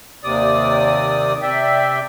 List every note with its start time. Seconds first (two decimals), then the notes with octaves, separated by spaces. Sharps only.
0.24 D#2 C3 D5 D#6
1.42 C3 D5 E5 G5